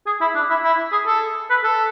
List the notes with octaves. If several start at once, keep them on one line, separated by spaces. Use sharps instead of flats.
G#4
E4
D4
E4
E4
G#4
A4
B4
A4